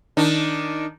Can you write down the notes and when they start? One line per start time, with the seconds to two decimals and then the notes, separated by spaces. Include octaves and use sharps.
0.17 D#3 D4 D#4